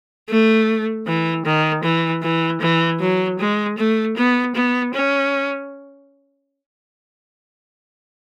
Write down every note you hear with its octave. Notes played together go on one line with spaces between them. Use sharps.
A3
E3
D#3
E3
E3
E3
F#3
G#3
A3
B3
B3
C#4